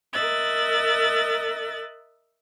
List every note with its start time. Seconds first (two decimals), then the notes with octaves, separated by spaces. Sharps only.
0.14 A#4 D#5 E5 F#6 A6